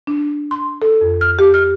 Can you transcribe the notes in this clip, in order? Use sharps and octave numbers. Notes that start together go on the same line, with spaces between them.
D4
C6
A4
F2
F6
G4
F6